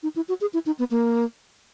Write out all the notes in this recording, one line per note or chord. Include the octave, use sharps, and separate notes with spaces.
D#4
E4
F#4
G#4
E4
D#4
B3
A#3